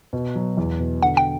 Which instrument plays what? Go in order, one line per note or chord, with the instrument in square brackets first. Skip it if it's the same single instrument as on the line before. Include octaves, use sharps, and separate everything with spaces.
[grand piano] B2
F#3
E2
B2
[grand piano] D3 [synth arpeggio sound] F#5
[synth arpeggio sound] G5